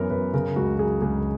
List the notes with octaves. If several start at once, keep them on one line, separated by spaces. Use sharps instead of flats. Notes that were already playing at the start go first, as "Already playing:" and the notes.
Already playing: F#2 E3 B3 A#4 C#5
F#2 B4
C#3 A#4
C#2 F#4
F#3 G#4
C#2 G#4